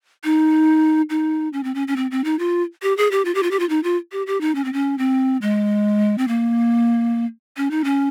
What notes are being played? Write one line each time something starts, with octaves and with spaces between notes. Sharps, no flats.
D#4
D#4
C#4
C4
C#4
C#4
C4
C4
D#4
F4
G4
G#4
G4
F4
G4
F4
G4
F4
D#4
F4
G4
G4
D#4
C#4
C4
C#4
C4
G#3
C4
A#3
C#4
D#4
C#4